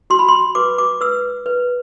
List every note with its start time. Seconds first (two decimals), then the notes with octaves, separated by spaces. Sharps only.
0.10 F#4 C6
0.19 B5
0.28 C6
0.55 B4 D6
0.78 D6
1.01 B4 E6
1.46 B4